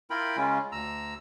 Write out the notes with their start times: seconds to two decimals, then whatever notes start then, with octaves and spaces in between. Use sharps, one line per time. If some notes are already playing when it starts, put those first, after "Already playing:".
0.10 E4 F4 A#4 G5 B5
0.37 C#3 G#3 C#4 F4
0.72 D2 A#5 E6